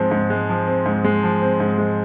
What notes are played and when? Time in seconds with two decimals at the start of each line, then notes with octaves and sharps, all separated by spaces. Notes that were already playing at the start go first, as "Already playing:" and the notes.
Already playing: G#2 F3 G#3 C4
0.11 G#2
0.30 G#3
0.49 F3
0.67 C4
0.86 G#2
1.04 G#3
1.23 F3
1.42 C4
1.60 G#2
1.78 G#3